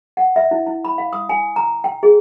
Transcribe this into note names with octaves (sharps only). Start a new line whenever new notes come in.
F#5
E5
E4
E4
B5
F5
D#6
G#5
A#5
G5
G#4